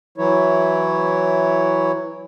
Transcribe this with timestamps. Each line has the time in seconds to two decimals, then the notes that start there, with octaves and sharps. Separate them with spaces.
0.18 E3 F#3 E4 C#5